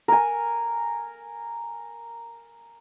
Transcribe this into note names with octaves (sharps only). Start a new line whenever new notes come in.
A#4 G#5